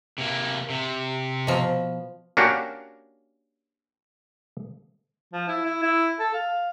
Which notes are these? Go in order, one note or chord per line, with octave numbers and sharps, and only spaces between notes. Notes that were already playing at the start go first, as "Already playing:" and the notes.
C3 A#3
C3
B2 F3
A#3 C#4 D4 F#4 G4 A#4
F3
E4
E4
E4
A4
F5